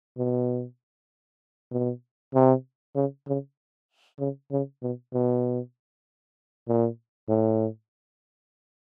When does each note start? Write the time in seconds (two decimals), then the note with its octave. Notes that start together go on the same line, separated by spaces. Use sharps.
0.18 B2
1.71 B2
2.35 C3
2.95 C#3
3.28 C#3
4.19 C#3
4.51 C#3
4.82 B2
5.13 B2
6.68 A#2
7.29 A2